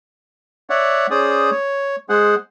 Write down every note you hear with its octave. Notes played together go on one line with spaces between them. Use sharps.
C#5 D5 E5 F#5
C#4 G#4 C5 D5 D#6
C#5
G#3 G#4 C5 F#5